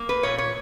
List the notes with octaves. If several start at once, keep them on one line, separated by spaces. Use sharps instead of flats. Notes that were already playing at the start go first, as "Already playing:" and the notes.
Already playing: A#3
B4
A#2 C#5
C#5